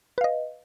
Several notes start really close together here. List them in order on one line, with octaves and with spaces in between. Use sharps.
B4 F5 D#5